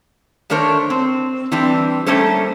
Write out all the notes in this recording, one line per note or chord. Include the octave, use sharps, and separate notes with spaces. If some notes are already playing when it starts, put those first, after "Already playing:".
D#3 A3 D4 A#4 C5 C#5
C4
E3 G3 C4 D4
G3 A3 A#3 C#4 A4 C5